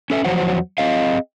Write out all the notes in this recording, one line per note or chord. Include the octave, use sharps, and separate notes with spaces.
C#4 A4 E5
E2 F3 F#3 C5 F#5
C4 G#4 D#5 F5